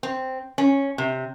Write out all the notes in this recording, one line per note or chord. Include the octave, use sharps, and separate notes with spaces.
C4
C#4
C3